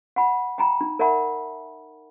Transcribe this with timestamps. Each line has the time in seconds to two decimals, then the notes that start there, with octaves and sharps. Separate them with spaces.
0.16 F#5 B5
0.58 G5 A#5 B5
0.81 D#4
0.99 A#4 D5 E5 F#5 A5 B5